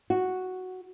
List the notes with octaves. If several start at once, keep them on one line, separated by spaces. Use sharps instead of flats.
F#4